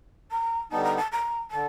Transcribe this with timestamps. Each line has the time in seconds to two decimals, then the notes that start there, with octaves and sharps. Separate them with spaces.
0.31 A#5
0.71 D3 G3 B3 D#4 A5
0.84 A#5
0.97 A5
1.12 A#5
1.51 D3 A5